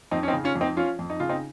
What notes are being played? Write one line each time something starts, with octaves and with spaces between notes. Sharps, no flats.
F2 C4 D#4
C#4
C4 D#4
C#3
C#4 F4
F2
C4 D#4
F3 C#4 F4
F2
D#4
C#3 F4
C4 D#4